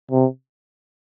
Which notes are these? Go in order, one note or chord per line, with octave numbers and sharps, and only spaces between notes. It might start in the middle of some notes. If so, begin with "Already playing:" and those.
C3